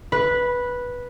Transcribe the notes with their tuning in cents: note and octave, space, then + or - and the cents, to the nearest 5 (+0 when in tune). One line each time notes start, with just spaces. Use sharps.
B4 -10